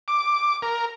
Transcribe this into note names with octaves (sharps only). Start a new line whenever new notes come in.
D6
A#4